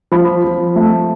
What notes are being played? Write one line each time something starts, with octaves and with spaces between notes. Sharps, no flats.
F3 B5
F3
A3